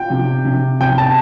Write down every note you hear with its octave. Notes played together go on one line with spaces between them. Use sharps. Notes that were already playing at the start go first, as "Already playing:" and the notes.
Already playing: F4 G5
C3
C3
C3 G5
A5